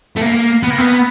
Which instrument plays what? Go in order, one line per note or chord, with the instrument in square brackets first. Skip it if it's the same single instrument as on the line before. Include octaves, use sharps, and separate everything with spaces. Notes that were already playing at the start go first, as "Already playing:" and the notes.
[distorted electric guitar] A3
A#3
B3
A#3
B3